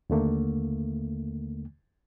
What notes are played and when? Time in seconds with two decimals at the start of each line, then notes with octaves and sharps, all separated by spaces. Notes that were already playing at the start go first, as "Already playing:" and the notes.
0.10 D#2 D3 A3 A#3